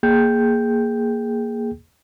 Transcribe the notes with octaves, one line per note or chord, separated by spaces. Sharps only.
A#3 G#4 G5 G6